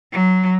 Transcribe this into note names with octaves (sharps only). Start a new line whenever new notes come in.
F#3